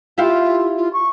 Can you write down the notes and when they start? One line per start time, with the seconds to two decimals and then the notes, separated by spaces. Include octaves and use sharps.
0.18 E4 F4 G4 F5
0.77 F4
0.93 C#6